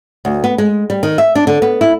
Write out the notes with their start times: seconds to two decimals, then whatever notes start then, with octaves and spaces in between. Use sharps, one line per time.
0.25 D2
0.44 B3
0.58 G#3
0.90 G3
1.03 D#3
1.18 E5
1.35 D4
1.47 D3
1.62 B3
1.81 E4